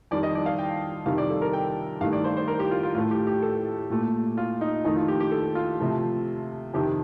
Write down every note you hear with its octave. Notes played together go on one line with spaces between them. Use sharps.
F2 D#3 G3 D5
D#5
D5
F5
G5
F2 C3 D#3 G3 F5
D5
A4
A#4
G5
G2 D#3 A3 F5
D5
C5
C5
A#4
G4
F4
F4
A2 A3 F4
G4
G4
A4
A#2 A3
F4
D#4
F2 D#3 A3 D#4
F4
G4
G4
A4
F4
C3 F3 A3
F2 C3 D#3 G4